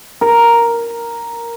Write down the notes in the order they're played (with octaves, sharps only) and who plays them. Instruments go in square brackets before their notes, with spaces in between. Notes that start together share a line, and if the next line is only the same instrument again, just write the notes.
[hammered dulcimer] A#4